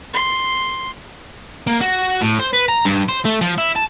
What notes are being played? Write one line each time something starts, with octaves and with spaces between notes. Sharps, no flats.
C6
A#3
F#4
A2
C5
B4
A#5
G2
C5
A3
F3
E4
A5